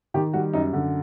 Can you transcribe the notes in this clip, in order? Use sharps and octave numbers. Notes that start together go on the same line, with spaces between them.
D#3 G4
G3 F#4
F#2 D#4
D3